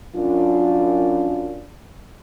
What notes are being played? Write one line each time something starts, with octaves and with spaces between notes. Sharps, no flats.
F#2 D4 F4